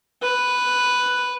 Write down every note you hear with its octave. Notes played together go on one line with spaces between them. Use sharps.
B4